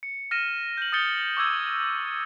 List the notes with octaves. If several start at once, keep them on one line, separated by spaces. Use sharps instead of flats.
C#7
F6 A#6 D#7 E7
G6 F#7
D#6 G6 A6 C#7 G7
C#6 D6 E6 G#6 F#7